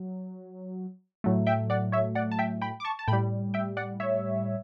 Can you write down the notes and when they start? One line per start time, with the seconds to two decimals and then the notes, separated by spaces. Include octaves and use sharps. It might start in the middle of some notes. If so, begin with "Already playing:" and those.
Already playing: F#3
1.24 A2 F#3 A3
1.46 E5 G5
1.70 D5 F#5
1.92 C#5 E5
2.15 D5 F#5
2.31 A5
2.39 E5 G5
2.61 G5 B5
2.80 D6
2.85 A5 C#6
2.99 A5
3.08 A2 G5 B5
3.13 G3
3.54 E5 G5
3.77 D5 F#5
4.00 C#5 E5